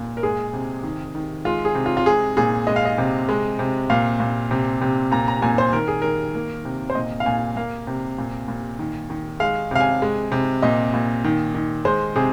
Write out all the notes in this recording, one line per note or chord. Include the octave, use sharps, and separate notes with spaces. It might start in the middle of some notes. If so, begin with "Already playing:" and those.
Already playing: A#2
A#4
G#3 G#4
C3
D#3
D#3
G#3 F4
G#4
C3
F4
F4
G#3 G#4
A#2 G#4
G#3 D#5
F5
D#5
C3
G#3
C3
A#2 F5
A#2
C3
C3
A#2 A#5
A#5
A#2 G#5
C5
D#3 A#4
G#4
D#3 A#4
A#3
C3
C5
A#2 D#5
F5
A#2 G#5
A#3 F5
C3
A#2
A#2
D#3
D#3
G#3 F5
C3 F5
G#5
G#3
C3
A#2 D#5
A#2
D#3
D#3
G#3 C5
C3 G#4